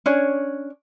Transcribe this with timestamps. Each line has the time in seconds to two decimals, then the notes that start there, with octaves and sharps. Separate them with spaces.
0.06 C#4 D4 C#5